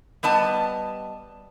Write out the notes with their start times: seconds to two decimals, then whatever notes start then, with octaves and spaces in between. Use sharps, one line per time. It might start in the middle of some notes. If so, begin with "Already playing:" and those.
0.23 G3 B3 D#5 A5